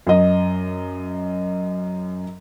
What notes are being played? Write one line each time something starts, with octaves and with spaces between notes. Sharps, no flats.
F#2 D#5